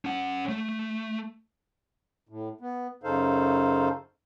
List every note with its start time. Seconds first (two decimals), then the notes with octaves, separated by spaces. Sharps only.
0.05 C#4 F#5
0.49 A3
2.29 A2
2.61 B3
3.04 F#2 C#3 D#4 A4 C5 F5